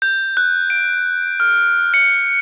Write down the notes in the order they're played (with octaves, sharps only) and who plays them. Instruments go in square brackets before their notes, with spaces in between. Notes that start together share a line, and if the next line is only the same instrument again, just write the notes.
[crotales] G6
F#6
D7
F6
C#7